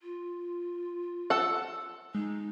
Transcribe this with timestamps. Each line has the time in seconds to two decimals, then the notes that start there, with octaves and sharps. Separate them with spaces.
0.02 F4
1.30 A4 F#5
2.15 G#3 D#4